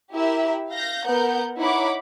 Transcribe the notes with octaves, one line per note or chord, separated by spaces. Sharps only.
E4 G4 A#4 E5
F5 G6 A#6
B3 A#4 F#5 G6
D#4 E4 C#5 F#5 B5 D6